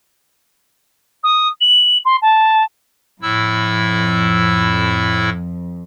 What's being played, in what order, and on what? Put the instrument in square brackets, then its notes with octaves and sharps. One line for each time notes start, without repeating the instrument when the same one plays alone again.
[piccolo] D#6
F#7
C6
A5
[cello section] F2 [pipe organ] A2 E4 E6